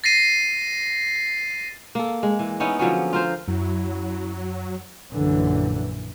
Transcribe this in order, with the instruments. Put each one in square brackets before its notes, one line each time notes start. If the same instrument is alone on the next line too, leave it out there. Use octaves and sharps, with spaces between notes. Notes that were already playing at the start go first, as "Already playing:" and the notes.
[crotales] A6 A#6 C7 D#7
[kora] A#3 A4
G#3
E3
B3 C#4 D#4 E4
D3 F3 F#3 C#4
F4 A#4 C5
[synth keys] F#2 [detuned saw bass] F#3 [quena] E4
[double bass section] A#1 F#2 A#2 D3 E3